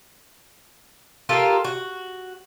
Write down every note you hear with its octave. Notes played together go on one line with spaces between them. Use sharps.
F4 G4 A4 A#4
F#4